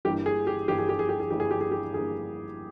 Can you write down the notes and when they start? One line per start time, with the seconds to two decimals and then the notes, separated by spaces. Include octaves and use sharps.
0.05 G1 G2 E3 A#3 G4
0.26 G#4
0.47 G4
0.68 G1 G2 E3 A#3 G4
0.78 G#4
0.89 G4
0.99 G#4
1.09 G4
1.20 G#4
1.31 G1 G2 E3 A#3 G4
1.40 G#4
1.51 G4
1.61 G#4
1.71 G4
1.94 G1 G2 E3 A#3 G#4